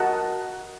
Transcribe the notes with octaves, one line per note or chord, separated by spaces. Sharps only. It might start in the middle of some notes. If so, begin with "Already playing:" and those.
Already playing: F#4 A#4 D#5 F#5 A5